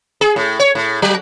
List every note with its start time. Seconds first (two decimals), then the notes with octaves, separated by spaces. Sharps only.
0.21 G#4
0.36 A2
0.59 C#5
0.75 A2
1.02 F#3